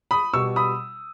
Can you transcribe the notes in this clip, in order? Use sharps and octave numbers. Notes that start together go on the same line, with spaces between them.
B5 D#6
B2 G3 C#6 E6
B5 D#6